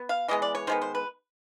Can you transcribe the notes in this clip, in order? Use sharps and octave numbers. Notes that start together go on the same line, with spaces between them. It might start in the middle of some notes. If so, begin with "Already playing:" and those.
Already playing: B3
F5
E3 G#3 B3 D#5
D5
C#5
D#3 G#3 B3 C5
C5
B4